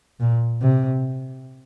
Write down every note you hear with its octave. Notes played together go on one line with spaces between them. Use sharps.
A#2
C3